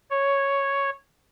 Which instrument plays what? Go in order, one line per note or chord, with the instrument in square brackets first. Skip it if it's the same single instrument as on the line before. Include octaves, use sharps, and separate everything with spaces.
[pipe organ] C#5